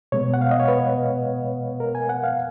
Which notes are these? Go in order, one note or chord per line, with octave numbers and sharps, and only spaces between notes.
B2 G#3 B3 C#5
F#5
F5
D#5
C#5
B4
A#4
G#5
F#5
F5